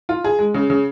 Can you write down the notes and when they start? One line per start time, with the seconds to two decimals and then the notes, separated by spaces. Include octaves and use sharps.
0.09 F4
0.24 G#4
0.39 G#3
0.54 C#3
0.70 C#3